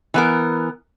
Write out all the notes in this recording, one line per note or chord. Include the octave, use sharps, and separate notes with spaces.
E3 B3 A#4